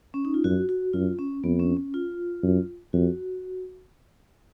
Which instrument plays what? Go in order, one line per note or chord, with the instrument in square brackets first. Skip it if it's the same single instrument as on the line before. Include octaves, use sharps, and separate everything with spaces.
[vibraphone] C#4
D#4
F4
[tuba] F#2 [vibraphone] F#4
[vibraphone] F#4
[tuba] F#2 [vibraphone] F4
[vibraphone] C#4
[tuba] F2 [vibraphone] B3
[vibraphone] C#4
C#4
F4
[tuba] F#2
[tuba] F2 [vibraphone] F#4